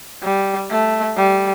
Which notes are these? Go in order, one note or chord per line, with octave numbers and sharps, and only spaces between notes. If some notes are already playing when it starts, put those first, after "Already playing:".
G3
A3
G3